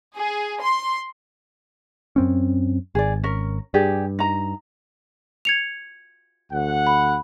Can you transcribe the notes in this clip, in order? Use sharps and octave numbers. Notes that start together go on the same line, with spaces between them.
G#4
C6
F#2 C4 C#4
G#1 G#4 D5
C#4 A#4
G2 G4 G#4 D5
D#4 A#5
G#6 C#7 F7
D2 F#5
B5